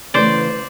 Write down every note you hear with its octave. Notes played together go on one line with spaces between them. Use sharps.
C#3 E3 A3 C5 D5